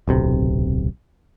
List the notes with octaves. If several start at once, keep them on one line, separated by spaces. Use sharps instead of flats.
D1 B1 C3